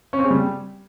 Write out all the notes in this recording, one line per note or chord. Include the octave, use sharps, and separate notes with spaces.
C#4
C4
G#4
G3